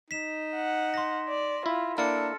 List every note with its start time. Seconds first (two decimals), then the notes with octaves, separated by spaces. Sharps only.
0.11 D#4 B6 E7
0.56 F#5
0.94 C6 A#6
1.29 D5
1.66 E4 F4 E5
1.98 A#3 D4 E4 A4 F6 A6 C#7